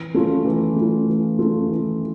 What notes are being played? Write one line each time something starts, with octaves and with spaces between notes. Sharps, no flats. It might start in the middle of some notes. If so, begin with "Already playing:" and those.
Already playing: E3
A3 C#4 F4
E3
A3 C#4 F4
E3
A3 C#4 F4
E3